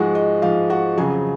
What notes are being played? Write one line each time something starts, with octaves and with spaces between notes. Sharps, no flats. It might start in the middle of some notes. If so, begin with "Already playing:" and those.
Already playing: G#2 F3 G#3 F#4 F#5
D#5
G#2 F3 G#3 F5
F#4 F#5
F2 C#3 F#3 G#4 G#5